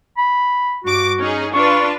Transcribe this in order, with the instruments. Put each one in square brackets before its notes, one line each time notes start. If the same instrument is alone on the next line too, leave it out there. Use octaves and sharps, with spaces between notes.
[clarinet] B5
[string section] G2 D6 [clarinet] F#4
[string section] C#4 D#4 G#4
[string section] D4 F4 B4 [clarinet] C#6